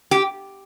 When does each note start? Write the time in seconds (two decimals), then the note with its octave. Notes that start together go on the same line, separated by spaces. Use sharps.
0.11 G4